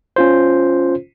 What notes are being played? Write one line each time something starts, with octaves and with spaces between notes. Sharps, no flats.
C#4 F4 C5